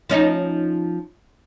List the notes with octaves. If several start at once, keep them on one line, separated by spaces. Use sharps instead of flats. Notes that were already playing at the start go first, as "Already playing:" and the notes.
F3 C#4 D#4